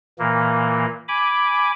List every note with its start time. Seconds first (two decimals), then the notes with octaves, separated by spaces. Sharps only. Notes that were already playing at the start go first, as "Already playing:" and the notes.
0.19 A#2 E3 A#3
1.08 G#5 B5 D6